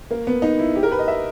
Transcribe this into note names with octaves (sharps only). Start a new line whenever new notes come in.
A#3
B3
D#4
E4
G4
A#4
B4
D#5
E5